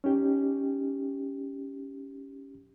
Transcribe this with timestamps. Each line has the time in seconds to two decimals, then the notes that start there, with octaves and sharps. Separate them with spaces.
0.04 C#4 D#4 G4